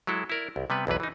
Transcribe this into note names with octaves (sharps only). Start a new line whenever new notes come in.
F#3 G#3 E4 A4
E4 A#4 D5
C2
C3 G3 B3 B4
B1 E2 E3 B4
E3 D#4